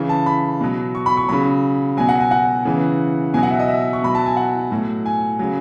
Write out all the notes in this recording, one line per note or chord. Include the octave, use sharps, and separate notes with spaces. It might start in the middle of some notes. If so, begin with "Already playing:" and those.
Already playing: C#3 E3
A5
B5
B2 F#3
C#6
B5
C#6
C#3 F#3 B5
B2 F#3 G#5
F#5
G#5
F#5
C#3 E3
B2 F#3 G#5
F#5
E5
D#5
E5
C#6
B2 F#3 B5
A5
G#5
F#5
A2 F#3
G#5
C#3 F#3